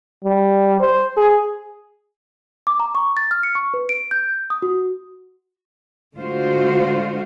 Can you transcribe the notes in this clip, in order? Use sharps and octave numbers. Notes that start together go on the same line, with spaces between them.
G3
C5
G#4
D6
A#5
C#6
A6
F6
C#7
C#6
B4
D7
G6
D#6
F#4
D3 G#3 A3 F4 F#4 C5